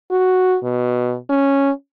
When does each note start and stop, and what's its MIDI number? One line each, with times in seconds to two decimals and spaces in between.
0.11 0.56 66
0.64 1.16 47
1.30 1.70 61